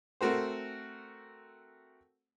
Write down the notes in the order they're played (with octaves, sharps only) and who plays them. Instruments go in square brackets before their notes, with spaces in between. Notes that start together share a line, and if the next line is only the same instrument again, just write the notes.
[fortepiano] A3 C4 F#4 A#4 C5